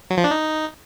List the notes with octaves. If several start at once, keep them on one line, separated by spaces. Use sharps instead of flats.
F#3
F3
D4
D#4